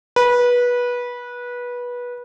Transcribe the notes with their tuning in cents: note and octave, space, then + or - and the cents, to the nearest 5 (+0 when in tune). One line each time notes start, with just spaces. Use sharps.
B4 -20